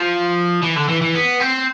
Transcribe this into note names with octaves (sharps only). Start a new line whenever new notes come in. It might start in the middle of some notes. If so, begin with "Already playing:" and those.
Already playing: F3
E3
D3
E3
E3
B3
C4